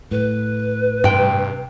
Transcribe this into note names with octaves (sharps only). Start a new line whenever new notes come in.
A2 B4
G2 C3 G5